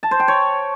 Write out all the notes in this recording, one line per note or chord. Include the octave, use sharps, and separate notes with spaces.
A5
C5
G5
C#5